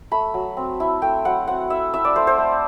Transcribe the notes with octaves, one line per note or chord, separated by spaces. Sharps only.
A3 B5
F#3
C4
E4
A3 G5
F#3 F#5
C4 F#5
E4 E5
E4 E5
D5
A3 C5
C5
A3